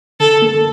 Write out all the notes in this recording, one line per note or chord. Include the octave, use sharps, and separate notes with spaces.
D3 A4
A#3